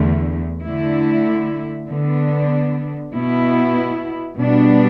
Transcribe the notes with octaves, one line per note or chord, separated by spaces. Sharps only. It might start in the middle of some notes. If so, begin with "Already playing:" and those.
Already playing: E2 D3 A3
D3 A3 E4
D3 B3 D4
B2 B3 E4
B2 G3 B3 D4